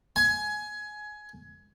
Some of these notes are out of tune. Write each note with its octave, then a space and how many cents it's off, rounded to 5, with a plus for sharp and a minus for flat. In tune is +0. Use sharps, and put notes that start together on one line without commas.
G#5 +20